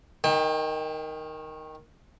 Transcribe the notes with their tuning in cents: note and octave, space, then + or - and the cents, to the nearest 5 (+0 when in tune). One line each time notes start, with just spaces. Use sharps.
D#3 +0 G5 +35